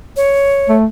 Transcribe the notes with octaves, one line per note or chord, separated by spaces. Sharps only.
C#5
A3